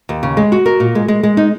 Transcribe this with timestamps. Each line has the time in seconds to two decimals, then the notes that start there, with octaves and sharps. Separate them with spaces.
0.09 D#2
0.23 C#3
0.37 G#3
0.52 F#4
0.66 A#4
0.80 A#2
0.95 G#3
1.08 G#3
1.23 G#3
1.37 D#4